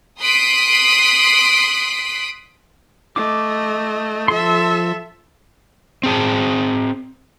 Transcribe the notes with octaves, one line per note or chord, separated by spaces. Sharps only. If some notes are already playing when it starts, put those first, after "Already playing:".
C6 D#6 F#6 B6 C7 D7
A3 D#5 D6
F3 A4 E5 C6
C4 G#4 A5